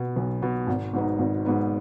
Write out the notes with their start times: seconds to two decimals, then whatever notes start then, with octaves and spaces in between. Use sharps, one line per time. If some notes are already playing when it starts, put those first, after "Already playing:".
Already playing: B2 B3
0.16 B1
0.42 B2 B3
0.67 G#1
0.93 G#2 F#3 B3 D#4
1.19 G#1
1.45 G#2 F#3 B3 D#4